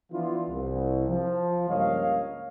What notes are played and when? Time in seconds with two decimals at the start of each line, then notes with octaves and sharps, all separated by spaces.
0.12 E3 F3 B3 D4 E4 F4
0.49 C2
1.09 F3
1.69 C#2 G2 A#3 C#5 D#5 F5